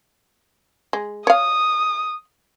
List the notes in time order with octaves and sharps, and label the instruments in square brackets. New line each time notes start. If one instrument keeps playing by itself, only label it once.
[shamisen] G#3
[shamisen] C#5 F5 [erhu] D#6